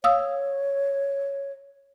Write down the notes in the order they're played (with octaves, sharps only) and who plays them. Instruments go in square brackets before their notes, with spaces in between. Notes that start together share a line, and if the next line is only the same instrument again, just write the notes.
[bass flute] C#5 [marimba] F5 D#6 E6